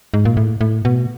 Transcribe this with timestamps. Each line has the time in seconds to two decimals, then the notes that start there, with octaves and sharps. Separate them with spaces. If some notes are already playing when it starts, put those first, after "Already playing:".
0.14 G#2
0.25 A#2
0.37 A2
0.61 A2
0.85 B2